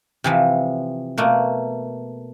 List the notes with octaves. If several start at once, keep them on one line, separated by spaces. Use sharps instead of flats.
C3 E3 F3
B2 A3 A#3